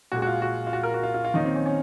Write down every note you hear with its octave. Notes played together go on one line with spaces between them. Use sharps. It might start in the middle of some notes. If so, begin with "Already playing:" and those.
A#2 G#3 F#4
F#4
F4
F#4
F4
F#4
A#4
F#4
F4
F4
F4
D#3 F#3 A#3 D#4
C4
C#4
C#4